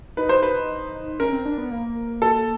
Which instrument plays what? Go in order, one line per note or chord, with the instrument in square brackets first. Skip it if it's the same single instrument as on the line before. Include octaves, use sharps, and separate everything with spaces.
[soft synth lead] D#4 [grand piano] B4
[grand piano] C5
B4
[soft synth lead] C#4 [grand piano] A#4
[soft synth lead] C4
D4
B3
A#3
[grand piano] A4